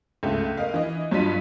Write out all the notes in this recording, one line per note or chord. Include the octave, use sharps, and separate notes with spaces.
C#2 A3
A#4 D#5 F5
E3 D#5
G2 F#3 F4 D#5 B6 D#7